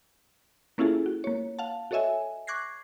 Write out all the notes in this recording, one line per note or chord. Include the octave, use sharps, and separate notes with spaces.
A#3 C#4 E4 F4 G#4 A4
F#4
A#3 C#5
F5 F#5 A5
F#4 A4 C#5 D#5 E5 G#5
C#6 D6 F#6 G#6 A#6 C7